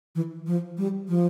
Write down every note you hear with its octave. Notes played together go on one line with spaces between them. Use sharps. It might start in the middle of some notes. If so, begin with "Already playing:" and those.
E3
F3
G3
F3